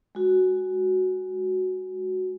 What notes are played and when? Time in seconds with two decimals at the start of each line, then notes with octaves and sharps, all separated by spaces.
0.15 G#3 F#4